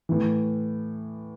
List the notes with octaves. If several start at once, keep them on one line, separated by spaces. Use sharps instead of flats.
A2 E3